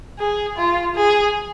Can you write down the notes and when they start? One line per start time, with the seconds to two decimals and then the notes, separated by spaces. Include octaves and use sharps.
0.20 G#4
0.57 F4
0.96 G#4